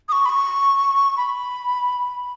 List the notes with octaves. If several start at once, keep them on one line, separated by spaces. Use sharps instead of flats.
D#6
C#6
B5
C#6
B5